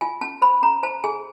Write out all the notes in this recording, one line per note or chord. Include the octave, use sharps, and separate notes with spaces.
F4 G#5
C#4 A5
C5 B5
C#4 A#5
C5 A5
G#4 G#5